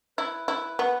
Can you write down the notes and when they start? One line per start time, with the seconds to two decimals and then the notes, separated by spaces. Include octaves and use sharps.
0.17 E4 B4
0.48 E4
0.79 B3